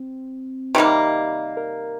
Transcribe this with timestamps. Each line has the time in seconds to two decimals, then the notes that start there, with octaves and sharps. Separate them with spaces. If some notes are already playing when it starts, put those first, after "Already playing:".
Already playing: C4
0.75 C3 D#3 G3 A#3
1.57 A#4